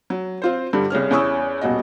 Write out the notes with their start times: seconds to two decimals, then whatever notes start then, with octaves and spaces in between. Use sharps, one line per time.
0.10 F#3
0.42 C4 F4 C5
0.73 G2 D3 G3
0.90 C2 C#3 C#4 F6
1.11 E2 C#4 E4 C#6 D#6 E6
1.61 D#1 B2 F#4 D#5